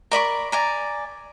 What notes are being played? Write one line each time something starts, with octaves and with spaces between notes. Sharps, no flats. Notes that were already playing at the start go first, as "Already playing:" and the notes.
A#4 D5 B5 C#6
D5 G#5 A#5